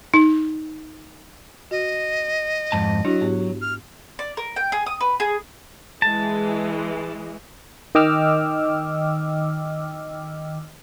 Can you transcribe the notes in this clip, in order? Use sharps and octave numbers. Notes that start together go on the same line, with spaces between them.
D#4
F#4 D#5
F2 G#2 A5
F#3 D4 E4 F#4
G#2 B3 G4
F6
D5
A#4
G5
G#4
D#6
B4
G#4
E3 G#3 A5
D#3 D#5 G5 D6 E6 F6